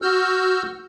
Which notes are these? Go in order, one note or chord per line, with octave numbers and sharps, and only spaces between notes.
F#4 E6 F6 G6